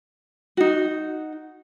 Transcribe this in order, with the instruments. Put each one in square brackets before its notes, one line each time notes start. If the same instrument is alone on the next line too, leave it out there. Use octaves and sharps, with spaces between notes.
[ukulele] D#4 F#4